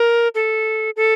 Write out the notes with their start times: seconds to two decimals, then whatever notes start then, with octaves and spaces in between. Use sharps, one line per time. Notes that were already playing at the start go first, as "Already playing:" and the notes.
Already playing: A#4
0.35 A4
0.96 A4